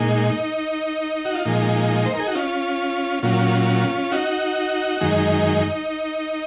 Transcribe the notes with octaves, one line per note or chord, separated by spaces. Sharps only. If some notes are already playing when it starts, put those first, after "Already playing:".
Already playing: A#2 G#3 D#4
F#4
F4
A#2 F3 G#3 D#4
C5
A#4
G#4
F#4
C#4 F4
A#2 F#3 C#4 F4
D#4 F#4
F#2 D#3 G#3 D#4